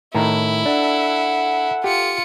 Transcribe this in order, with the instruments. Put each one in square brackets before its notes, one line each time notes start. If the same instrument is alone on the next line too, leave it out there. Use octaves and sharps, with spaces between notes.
[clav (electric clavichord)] A2 D#3 A#5 [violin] E4
[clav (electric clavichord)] D4 [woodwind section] A4 F#5
[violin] F4 C#7 [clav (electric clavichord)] G4